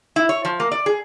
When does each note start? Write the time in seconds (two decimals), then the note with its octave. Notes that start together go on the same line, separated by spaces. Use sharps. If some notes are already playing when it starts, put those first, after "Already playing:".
0.16 E4
0.29 C#5
0.45 F3
0.60 A#3
0.71 D5
0.86 G#4